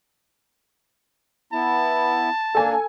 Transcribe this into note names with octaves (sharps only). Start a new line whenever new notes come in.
B3 E4 A5
A#3 D4 A4 G#5